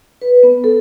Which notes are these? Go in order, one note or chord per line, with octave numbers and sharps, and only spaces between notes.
B4
B3
A4